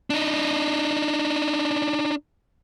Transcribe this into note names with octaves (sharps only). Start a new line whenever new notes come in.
D4 D#4